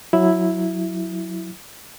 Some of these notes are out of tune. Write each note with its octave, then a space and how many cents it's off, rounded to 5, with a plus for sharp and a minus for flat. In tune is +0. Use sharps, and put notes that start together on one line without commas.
F#3 -10 E4 +0